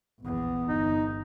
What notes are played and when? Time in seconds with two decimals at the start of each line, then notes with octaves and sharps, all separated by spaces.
0.20 A#1 E2 B3
0.68 G1 D#4